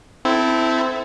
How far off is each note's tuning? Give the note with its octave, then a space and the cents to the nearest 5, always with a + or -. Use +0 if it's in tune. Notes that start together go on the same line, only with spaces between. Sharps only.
C4 -15 E4 +0 A4 -5